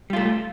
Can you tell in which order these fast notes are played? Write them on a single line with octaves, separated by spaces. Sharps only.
G3 F4 A3